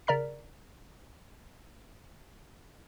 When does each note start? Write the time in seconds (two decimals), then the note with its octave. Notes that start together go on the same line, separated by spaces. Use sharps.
0.07 C#3 A#4 D5 A#5 F6 B6